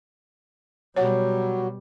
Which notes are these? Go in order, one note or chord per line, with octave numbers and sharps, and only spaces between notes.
B2 F#3 G3 C#5 F#5